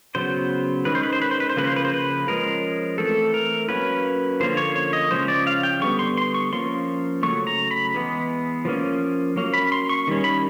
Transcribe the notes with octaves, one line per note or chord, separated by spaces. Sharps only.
C#3 F#3 B3 C5
D#3 G#3 C#4 B4
C5
B4
C5
B4
C5
B4
C5
C#3 F3 A#3 C#4 B4
C5
B4
C5
B4
F3 G#3 C#4 A#4
E3 A3 C4 A4
A#4
F#3 A#3 C#4 B4
D3 F3 A#3 C#4 C5
C#5
C#5
D#5
C#3 F3 G#3 C#4 C5
D5
F5
G5
D3 G3 B3 C#6
C6
C6
C#6
F3 A#3 C#4 C6
C#3 F#3 A3 C#6
A#5
B5
E3 G#3 B3
F3 A#3 C#4
F#3 A#3 C#4
B5
C6
C#6
D#3 G3 C#4
B5